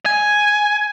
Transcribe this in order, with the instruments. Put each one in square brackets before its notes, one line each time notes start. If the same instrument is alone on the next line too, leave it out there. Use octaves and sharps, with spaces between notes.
[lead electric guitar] G#5